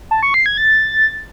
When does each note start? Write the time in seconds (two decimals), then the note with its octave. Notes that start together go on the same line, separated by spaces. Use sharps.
0.11 A5
0.23 C#6
0.34 C7
0.46 G#6
0.57 A6